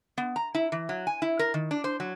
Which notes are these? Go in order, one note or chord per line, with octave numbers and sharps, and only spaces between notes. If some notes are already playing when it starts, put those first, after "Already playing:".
B3
A#5
E4
E3
F#3
G#5
E4
A#4
D#3
D4
C5
F#3